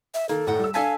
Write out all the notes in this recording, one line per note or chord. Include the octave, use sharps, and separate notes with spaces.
E5
D#3 A#3 A4
A2 D3 F#5 G5 A#5
G3 E6
D4 A4 F5 G#5 A5 G#6 B6